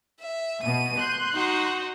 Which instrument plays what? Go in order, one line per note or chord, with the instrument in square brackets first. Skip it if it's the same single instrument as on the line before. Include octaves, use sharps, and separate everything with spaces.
[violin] E5
[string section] B2 [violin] D#7
[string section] C6 F#6 G6
[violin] D#4 F#4